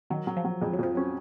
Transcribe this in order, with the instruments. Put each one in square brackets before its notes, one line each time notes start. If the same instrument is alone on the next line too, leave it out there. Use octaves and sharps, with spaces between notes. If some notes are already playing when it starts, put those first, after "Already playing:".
[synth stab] D#3 [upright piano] F#3
[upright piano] F#3
[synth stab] F3
[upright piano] F#3
[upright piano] F2 [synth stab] G#3
[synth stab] F#3
[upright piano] F2 [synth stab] F3
[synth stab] F#3 [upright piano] C#4